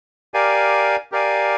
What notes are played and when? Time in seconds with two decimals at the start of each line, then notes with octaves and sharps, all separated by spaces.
0.34 G4 A#4 D5 F5 G#5
1.12 G4 A#4 D5 F5 G#5